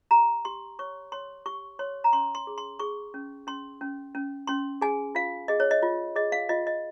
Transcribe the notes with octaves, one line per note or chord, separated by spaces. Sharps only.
G4 A#5
G4 C6
C#5 C#6
C#5 C6
G4 C#6
C#5 C6
A#5
C#4 C6
C6
G#4
C6
G#4 C#6
C#4
C#4 C6
C#4
C#4
C#4 C6
G#4 G#5
F4 F5
G#4 D#5
C#5
D#5
F4
G#4 D#5
F5
F4 D#5
D#5